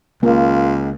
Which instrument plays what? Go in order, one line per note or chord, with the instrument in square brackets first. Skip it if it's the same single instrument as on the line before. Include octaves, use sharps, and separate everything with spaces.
[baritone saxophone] C#2 [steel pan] A#3 [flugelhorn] F4